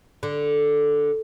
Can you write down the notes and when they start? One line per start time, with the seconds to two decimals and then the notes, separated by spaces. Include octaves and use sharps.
0.23 D3